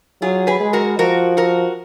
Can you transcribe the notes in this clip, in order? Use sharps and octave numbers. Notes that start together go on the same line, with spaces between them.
F#3 F4 G#4
G#4 B4
G#3
F#4 A#4
F3 F#4 A#4
F#4 A#4